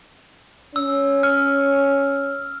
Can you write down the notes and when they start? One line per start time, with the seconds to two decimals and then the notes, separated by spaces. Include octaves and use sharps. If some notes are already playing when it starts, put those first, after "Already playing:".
0.76 C#4 E6
1.23 F6